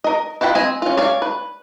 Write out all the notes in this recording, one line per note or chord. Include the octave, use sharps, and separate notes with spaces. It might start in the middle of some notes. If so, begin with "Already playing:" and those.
A#4 D#5
E4 F4 F#5 G5 B5
C4 D#5 G#5
C#4 F4
C#5 D5 F5
B4